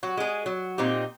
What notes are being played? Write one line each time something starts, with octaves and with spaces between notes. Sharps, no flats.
F#3 F#4
G#3 G#4
F#3
A#2 C4 D#4 G4